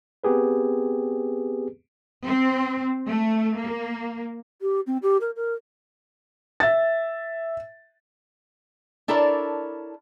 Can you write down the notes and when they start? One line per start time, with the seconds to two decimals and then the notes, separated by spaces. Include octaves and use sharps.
0.24 B3 C4 G4 G#4 B4
2.25 C4
3.07 A3
3.59 A#3
4.61 G4
4.87 C4
5.03 G4
5.21 A#4
5.36 A#4
6.60 E5 A6
9.08 D4 E4 A4 A#4 C#5 D5